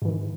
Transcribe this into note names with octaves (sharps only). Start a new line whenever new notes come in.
G#2 D#3 E3